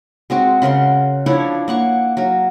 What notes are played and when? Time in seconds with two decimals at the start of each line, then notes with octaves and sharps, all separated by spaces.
0.30 G#3 C4 F#4
0.62 C#3 A#4 F#5 C6
1.26 F3 D4 E4 C#5
1.68 A#3 F#5 C#6
2.17 F#3 A#4